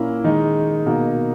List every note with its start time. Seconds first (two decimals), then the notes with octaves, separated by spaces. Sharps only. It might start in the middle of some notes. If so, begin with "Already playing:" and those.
Already playing: A#2 A#3 C#4 E4
0.24 D#3 G#3 D#4
0.86 B2 A#3 D#4